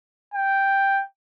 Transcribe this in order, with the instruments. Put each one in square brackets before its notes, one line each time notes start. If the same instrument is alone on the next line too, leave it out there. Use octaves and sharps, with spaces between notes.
[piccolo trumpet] G5